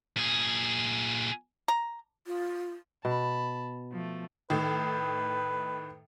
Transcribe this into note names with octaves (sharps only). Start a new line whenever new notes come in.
A#2 G#4
A#5
F4
B2 A5 B5
F3 A3
A2 D#3 B4